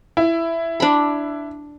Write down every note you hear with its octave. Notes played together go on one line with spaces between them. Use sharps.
E4
D4 B5